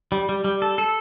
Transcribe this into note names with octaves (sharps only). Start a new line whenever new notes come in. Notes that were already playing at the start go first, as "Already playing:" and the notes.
G3
G3
G3
A4
A4